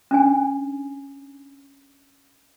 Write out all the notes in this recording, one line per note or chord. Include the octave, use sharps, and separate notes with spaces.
C#4 D4 G#5